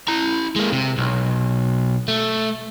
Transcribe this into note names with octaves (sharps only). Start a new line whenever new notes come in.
E4 A#5
G#3 A#3
C3
B1
A3